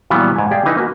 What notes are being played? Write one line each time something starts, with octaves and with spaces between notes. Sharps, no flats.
A#2 E3 F#3 G3 B3
G#2 G#5
G4 G#4 D5 F5 G5
E3 D#4 B4 G#5
A#3 F#4